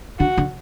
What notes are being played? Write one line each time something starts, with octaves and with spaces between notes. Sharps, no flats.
D3 F#4
D3